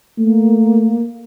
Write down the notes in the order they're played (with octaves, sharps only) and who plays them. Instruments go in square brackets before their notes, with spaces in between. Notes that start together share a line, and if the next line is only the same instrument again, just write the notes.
[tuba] A3 [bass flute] A#3